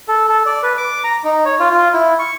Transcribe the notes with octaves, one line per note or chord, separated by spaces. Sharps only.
A4
A4
D5
B4
D6
A#5
D#4
C#5
F4
F4
E4
C#6